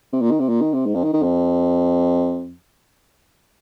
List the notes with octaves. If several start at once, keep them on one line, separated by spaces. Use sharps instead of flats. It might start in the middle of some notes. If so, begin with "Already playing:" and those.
C3
A#2
D#3
C3
A#2
D#3
C3
G#2
F2
D#3
D#3
F2